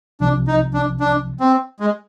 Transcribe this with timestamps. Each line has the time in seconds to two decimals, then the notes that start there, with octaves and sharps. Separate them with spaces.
0.20 C2 C3 F3 D4
0.48 D#4
0.74 D4
1.00 D4
1.40 C4
1.80 G#3